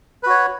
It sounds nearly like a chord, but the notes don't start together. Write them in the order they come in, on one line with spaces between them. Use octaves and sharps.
B4 F#4 C#5